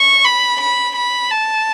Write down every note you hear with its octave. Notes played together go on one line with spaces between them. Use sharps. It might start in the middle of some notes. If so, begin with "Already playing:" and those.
Already playing: C#6
B5
B5
B5
A5